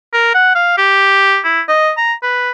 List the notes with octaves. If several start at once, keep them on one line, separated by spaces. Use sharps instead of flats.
A#4
F#5
F5
G4
E4
D#5
A#5
B4